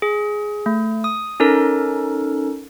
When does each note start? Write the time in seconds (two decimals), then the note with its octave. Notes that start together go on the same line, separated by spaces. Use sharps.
0.02 G#4
0.66 A3
1.04 D#6
1.40 C#4 D#4 A4 A#4